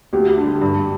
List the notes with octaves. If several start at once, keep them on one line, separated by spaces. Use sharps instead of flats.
D2 G4
D3 G3
G2